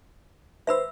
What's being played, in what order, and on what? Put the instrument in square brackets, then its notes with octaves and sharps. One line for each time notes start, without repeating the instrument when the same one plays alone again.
[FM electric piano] B4 C5 [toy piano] E5 B5 E6